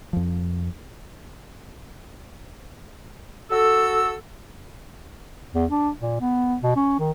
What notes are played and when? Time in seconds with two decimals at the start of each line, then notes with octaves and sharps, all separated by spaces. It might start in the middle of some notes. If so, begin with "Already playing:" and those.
0.13 F2 F3
3.51 F#4 A4 E6
5.54 E2
5.71 D4
5.99 A#2
6.21 B3
6.63 B2
6.76 C#4
6.99 D#3